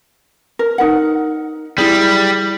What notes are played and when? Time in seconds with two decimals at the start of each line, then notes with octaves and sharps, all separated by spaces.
0.59 A#4
0.78 D#4 A#4 F#5
1.78 G3 E4 G#4